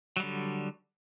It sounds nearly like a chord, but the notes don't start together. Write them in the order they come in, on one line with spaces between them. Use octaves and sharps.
F#3 G3 D3